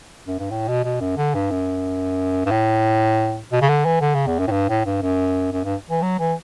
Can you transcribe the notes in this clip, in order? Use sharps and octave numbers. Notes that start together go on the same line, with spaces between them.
F#2
G2
A2
B2
B2
F#2
D3
G2
F#2
G2
A2
B2
C#3
D3
E3
D3
C#3
E2
F#2
A2
G2
A2
G2
F#2
F#2
G2
E3
F#3
E3